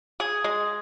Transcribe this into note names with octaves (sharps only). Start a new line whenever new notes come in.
G#4
G#3